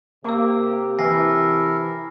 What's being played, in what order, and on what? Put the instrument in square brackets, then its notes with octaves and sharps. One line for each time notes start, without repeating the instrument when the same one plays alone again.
[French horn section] C3 G4 [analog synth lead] A#3 [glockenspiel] D6 E6
[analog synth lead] E3 [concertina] E4 A4 A#4 [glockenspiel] G#5 A#6 C7